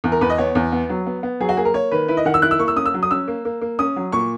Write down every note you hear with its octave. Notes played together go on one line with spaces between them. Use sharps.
E2
A#4
E2 B4
D#5
B3 C#5
E2
B3
F#3
B3
B3
F#3 G#4
F#4
A#3 G#4
A#4
A#3 C#5
D#3 B4
E4 B4
D#5
D#3 F#5
E6
E4 F#6
E6
A#3 C#6
E6
C#4 D#6
E6
F#3
D#6
C#4 E6
A#3
A#3
A#3
C#4 D#6
F#3
A#2 C#6